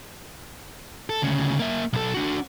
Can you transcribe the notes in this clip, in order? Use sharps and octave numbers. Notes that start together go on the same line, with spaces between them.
A4
D2 C#3
A#3 E5
B1 A4
D4 F#4